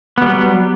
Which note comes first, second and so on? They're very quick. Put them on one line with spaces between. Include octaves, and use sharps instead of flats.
B3 G3 F#3